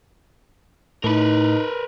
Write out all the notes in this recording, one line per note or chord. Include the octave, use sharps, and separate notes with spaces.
A2 D#4 A#4 B4